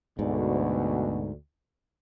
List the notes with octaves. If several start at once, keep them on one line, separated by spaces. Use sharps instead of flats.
D2 G#2 B2